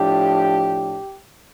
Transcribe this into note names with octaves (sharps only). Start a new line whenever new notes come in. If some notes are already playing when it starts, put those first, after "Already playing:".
Already playing: A2 F3 D4 G4